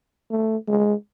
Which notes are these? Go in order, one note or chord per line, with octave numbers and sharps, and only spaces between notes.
A3
G#3